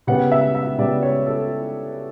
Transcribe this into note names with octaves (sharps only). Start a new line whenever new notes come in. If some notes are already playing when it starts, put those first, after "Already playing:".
C#3 G3 B3 F#5
E5
E5
C#3 G3 B3 D5
C#5
A4